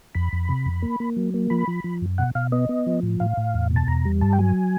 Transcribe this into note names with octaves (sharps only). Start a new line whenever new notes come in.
F2 B5
F2
C3
F2
A#3
A#3
F#3
A#3
F3 B5
F3
F3
F#2
B2 F#5
B2 F5
B3 D#5
B3
F3
A2
A2 F5
A2
E2
B2
A5
E2 A#5
G3
G2 A5
G5
F#3 G#5